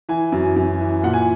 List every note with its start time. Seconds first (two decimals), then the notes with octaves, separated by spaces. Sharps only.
0.09 E3 G#5
0.32 F#2
0.56 F#2
0.80 E3
1.03 A#2 F#5
1.13 G#5